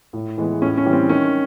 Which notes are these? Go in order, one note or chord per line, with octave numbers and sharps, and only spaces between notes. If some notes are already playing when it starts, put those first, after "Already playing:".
A2
E3 G#3 B3
A2 C#4
C#4
E3 G3
C4
D#3 C#4